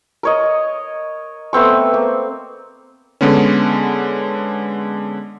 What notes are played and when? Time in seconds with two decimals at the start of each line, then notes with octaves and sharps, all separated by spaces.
0.23 A#4 C#5 D#5
1.53 A3 B3 C4 C#6
1.94 A#3
3.21 D3 G#3 B3 C#4